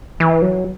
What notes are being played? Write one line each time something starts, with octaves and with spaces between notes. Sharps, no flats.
E3
F#3